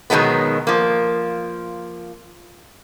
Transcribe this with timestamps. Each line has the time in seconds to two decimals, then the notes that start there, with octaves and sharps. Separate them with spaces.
0.10 B2 D#3 F#3 G#3 B3
0.67 F3 A#3